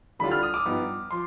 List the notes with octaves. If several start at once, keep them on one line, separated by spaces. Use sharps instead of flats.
D2 D3 G3 D4 F4 B5
F6
D#6
D6
G2 F3 B3 D#4
F3 C6